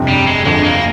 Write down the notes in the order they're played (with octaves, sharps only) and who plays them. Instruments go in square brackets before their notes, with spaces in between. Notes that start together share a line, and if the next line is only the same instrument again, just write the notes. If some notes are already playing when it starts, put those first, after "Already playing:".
Already playing: [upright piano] G1 F2 C3
[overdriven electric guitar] G3
G#3
[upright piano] G1 F2 D3 [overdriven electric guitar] G#3
[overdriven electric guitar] A#3